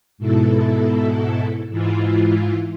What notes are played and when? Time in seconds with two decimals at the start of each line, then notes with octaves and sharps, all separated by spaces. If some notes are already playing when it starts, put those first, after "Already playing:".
0.18 G#2 B2 E4 A4
1.69 G#2 E3 E4 F4